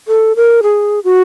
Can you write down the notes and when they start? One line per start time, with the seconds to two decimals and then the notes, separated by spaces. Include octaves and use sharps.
0.08 A4
0.36 A#4
0.63 G#4
1.04 F#4